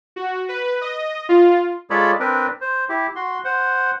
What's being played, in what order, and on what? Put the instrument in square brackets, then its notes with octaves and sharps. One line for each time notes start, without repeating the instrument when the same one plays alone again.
[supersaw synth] F#4
B4
D#5
F4
[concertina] G#3 F4 A4 C#5 D5 B5
C4 D4 A#4 B4
C5
E4 G4
F#4 C6
C5 F#5